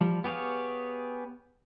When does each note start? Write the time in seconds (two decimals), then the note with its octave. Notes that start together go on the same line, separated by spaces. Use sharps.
0.01 F3 G3
0.24 B3 G4 G#4 C#5 F5